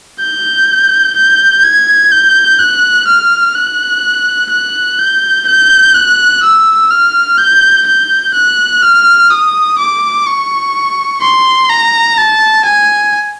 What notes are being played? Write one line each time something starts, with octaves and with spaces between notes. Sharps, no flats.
G6
G6
G#6
G6
F#6
F6
F#6
F#6
G6
G6
F#6
E6
F6
G6
G6
F#6
F6
D#6
D6
C#6
C6
A#5
A5
G#5